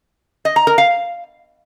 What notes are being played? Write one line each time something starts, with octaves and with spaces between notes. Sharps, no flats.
D#5
A#5
A#4
F5